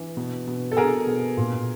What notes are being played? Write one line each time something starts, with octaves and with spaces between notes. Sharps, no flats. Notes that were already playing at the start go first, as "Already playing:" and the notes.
Already playing: E3
B2
B2
A4
B2 G#4 A#4
B2
A#2